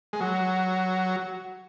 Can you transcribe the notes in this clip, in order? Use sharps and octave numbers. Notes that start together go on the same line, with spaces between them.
G#3
F#3